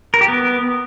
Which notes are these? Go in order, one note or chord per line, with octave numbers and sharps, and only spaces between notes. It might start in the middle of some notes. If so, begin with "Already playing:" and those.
A#4
G4
B3